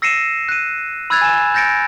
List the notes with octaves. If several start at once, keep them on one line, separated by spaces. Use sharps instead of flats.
E6 A#6 C7 C#7 D#7 E7
F#6 D#7
B5 E6 F#6 G#6 A6 F7
G#5 E7
G6 A6 A#6 C#7 D7